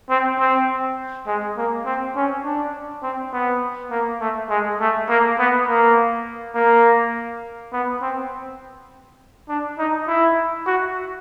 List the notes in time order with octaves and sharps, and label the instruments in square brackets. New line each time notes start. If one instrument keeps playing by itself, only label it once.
[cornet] C4
C4
G#3
A#3
C4
C#4
D4
C4
B3
A#3
A3
G#3
A3
A#3
B3
A#3
A#3
B3
C4
D4
D#4
E4
F#4